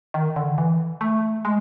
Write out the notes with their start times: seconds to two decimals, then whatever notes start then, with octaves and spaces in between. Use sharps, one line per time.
0.14 D#3
0.36 D3
0.58 E3
1.01 A3
1.45 G#3